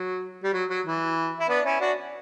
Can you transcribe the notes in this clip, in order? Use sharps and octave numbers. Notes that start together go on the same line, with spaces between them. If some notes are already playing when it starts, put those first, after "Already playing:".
Already playing: F#3
G3
F#3
F#3
E3
E4
B3 D4
C#4 E4
D4 F#4